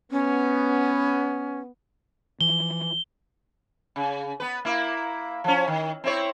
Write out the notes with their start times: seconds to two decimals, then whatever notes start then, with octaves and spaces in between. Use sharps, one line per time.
0.11 B3 C#4
2.41 E3 F3 G7
3.96 C#3
4.40 B3 B4
4.65 A#3 E4
5.44 F3 C#4
5.67 D#3
6.04 C4 E4 C#5